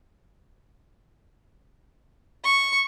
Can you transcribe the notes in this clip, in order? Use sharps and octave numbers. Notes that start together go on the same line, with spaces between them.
C#6